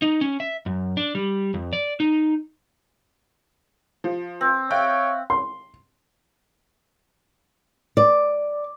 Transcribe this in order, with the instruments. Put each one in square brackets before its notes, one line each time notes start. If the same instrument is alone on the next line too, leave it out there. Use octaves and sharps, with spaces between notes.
[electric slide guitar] D#4
C#4
E5
F#2
D4
G3
F2
D5
D#4
[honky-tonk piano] F3
[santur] C4
[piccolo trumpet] C#5 [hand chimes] E5 F5 F#6 [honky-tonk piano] G5
[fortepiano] C6
[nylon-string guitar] D5